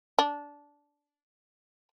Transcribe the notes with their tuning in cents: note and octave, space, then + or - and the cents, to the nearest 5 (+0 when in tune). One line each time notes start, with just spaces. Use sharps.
D4 -15